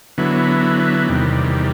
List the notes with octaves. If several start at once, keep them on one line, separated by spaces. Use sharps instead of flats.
D3 F#3 B3 E4
E2 C3 D#3 G3